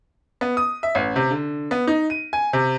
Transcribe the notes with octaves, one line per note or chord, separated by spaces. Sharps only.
B3
D#6
E5
A1
C3
D3
B3
D#4
D#7
G#5
C3